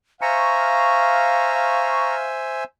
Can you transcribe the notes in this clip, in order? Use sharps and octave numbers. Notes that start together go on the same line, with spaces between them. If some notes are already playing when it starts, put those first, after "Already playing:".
C5 E5 F5 G#5 A#5 C#6